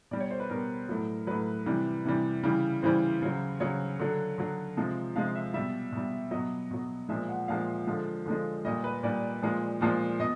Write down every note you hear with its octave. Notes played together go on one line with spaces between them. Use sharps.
B2 G3 D5
C#5
C5
B4
B2 G3 A#4
A2 F#3
A2 F#3 B4
C3 E3 G3
C3 E3 G3
C#3 E3 G3
C#3 E3 G3 C5
C#3 F#3
C#3 F#3 C#5
D3 F#3
D3 F#3
C3 F3 G#3
C3 F3 G#3 F5
E5
B2 G3 E5
B2 G3
B2 F#3 D#5
B2 F#3
A#2 F3 G#3 E5
F#5
A#2 F3 G#3 F5
D3 F3 G#3
D3 F3 G#3
A#2 G3 D#5
B4
A#2 G3 D5
A#2 F3 G#3
A#2 F3 G#3
B2 D#5